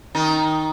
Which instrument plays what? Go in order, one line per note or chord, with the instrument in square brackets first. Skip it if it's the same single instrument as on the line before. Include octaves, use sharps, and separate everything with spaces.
[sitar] D#3 D#4